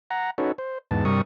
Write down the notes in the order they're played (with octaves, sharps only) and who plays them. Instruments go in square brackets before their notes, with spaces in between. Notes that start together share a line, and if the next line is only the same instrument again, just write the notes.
[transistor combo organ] F#5 A#5
C#4 D#4 F#4 A4 B4 C#5
C5
E2 G#2 B3 A5
G2 C3 G3 A#4 C#6 D#6